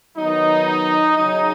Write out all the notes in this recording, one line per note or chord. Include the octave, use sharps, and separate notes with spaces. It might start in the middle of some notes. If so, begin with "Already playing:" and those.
D#3 F#3 B3 D#4
C#3 F#3 C#4 D#4